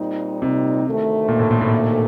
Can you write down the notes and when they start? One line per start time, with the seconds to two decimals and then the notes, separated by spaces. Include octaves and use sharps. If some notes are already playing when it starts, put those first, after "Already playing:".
Already playing: A#2 G3 C4 D#4
0.42 C3
0.86 D2 C3 D#3 A3
1.28 A#2
1.40 A2
1.51 A#2
1.61 A2
1.72 A#2